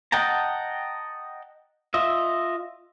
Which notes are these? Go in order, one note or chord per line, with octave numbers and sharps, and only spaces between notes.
D#5 F#5 G5 A5 A#5
F4 D#5 E5